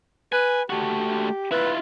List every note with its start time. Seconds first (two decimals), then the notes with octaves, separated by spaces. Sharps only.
0.32 B4 G#5
0.70 A3 F#4 G4
1.52 E4 F4 B4